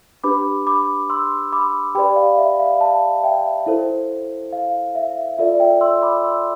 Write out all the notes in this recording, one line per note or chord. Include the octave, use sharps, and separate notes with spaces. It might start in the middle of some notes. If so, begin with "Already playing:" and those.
D4 G4 B4 B5 D6
B5 D6
C6 E6
B5 D6
G4 B4 D5 G5 B5
F5
E5
F5
F5 A5
E5 G5
E4 A4 C5
F5
E5
F4 A4 D5 E5
E5 G5
C6 E6
B5 D6
C6 E6